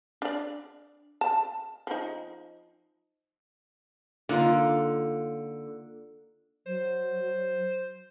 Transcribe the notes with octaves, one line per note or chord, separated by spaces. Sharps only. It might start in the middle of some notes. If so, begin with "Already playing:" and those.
D4 D5
A5
F3 D#4
D3 A#3 D#4 F4
F#3 C5